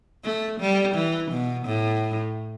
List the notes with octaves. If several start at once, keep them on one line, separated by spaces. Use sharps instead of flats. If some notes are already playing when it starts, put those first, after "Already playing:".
A3
G3
E3
B2
A2